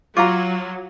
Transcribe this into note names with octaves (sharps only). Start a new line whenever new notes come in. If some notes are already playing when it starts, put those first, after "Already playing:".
F#3 F4 F5 A#5 C#6 D6